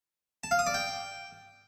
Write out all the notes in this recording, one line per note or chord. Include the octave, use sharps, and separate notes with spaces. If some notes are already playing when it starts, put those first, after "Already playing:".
A5
F5
D#6
D5
G5